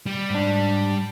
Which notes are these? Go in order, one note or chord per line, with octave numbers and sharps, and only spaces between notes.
G3
G#2 D4